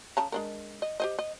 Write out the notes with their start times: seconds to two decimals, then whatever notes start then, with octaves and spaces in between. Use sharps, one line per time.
0.17 C#3 A5 A#5
0.32 G#3 D4 A#4
0.82 D#5
1.00 G4 C5 D#5
1.19 D#5